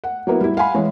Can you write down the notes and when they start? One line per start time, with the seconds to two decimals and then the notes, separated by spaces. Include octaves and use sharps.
0.04 F#5
0.27 F#3 A#3 B3 E4
0.41 G3 E4
0.57 F5 F#5 G#5 B5
0.74 E3 G#3 C#5